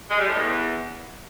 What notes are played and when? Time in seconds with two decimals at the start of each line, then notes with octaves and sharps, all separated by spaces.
0.11 G#3
0.19 G3
0.27 A2
0.35 E2